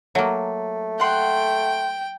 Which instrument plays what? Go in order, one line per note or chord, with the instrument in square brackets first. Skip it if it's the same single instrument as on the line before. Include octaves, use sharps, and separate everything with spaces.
[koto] F#3 A#3 [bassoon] A3
[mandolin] F#5 C6 [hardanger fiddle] G5